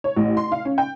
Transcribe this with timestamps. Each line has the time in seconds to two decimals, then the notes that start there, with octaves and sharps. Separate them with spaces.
0.04 C#5
0.17 A1
0.37 C6
0.52 F5
0.65 C#4
0.78 G5